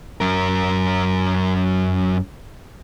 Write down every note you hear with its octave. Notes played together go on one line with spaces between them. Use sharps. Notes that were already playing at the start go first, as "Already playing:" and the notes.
F#2 A#4